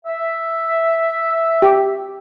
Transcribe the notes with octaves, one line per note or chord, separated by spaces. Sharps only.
E5
G4